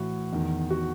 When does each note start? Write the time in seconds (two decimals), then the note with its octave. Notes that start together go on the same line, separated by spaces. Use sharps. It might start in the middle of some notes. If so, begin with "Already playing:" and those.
Already playing: A2 E3 E4 F#4
0.33 E2 D#3
0.70 F#4